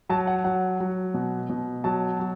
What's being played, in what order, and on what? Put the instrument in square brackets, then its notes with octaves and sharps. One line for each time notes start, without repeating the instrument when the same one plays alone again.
[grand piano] F#3 A5
F#5
F#3 F#5
F#3
B2
B2
F#3 A5
F#3